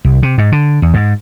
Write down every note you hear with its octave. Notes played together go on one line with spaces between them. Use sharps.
C2
C3
G#2
D3
E2
G#2